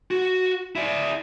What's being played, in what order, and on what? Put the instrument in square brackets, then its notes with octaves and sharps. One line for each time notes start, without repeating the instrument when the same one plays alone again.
[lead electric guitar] F#4
E4 D5